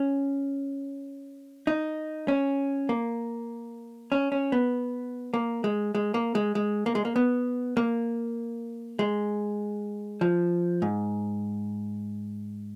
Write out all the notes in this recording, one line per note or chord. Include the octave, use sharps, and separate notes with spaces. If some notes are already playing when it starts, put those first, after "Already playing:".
Already playing: C#4
D#4
C#4
A#3
C#4
C#4
B3
A#3
G#3
G#3
A#3
G#3
G#3
A#3
G#3
A#3
B3
A#3
G#3
F3
G#2